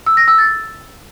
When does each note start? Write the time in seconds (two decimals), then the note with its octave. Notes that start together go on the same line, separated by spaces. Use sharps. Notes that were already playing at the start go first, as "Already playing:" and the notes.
0.07 E6
0.17 A#6
0.28 E6
0.38 A6